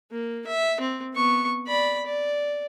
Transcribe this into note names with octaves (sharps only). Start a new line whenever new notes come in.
A#3
E5
C4
B3 C#6
D5 B5
D5